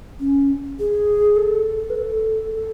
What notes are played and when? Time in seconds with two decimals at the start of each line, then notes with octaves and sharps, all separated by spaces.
0.20 C#4
0.79 G#4
1.36 A4
1.90 B4
1.96 A4
2.54 A4